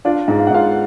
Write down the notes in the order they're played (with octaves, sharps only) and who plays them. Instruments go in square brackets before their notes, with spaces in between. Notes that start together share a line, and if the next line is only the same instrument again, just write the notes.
[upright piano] D4 D5 [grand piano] F4
[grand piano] G#2
[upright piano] F5
F#5
[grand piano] G#2 [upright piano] F4 F5